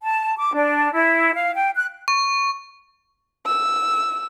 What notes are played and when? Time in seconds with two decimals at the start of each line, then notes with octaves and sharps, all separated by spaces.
0.02 A5
0.37 D6
0.53 D4
0.93 E4
1.34 F5
1.54 G5
1.75 F#6
2.08 C#6
3.46 E6